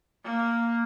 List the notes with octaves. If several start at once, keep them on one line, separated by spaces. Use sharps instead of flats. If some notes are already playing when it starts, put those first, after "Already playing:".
A#3